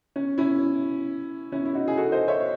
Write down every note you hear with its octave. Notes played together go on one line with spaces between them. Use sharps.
C#4
C#4 E4
C#4 E4
E4
D#4 F#4
G#4
F#4 A4
C5 D#5
C#5 E5